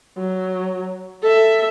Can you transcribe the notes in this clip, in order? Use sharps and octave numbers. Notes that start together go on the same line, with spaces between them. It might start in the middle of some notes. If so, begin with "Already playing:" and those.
F#3
A4 E5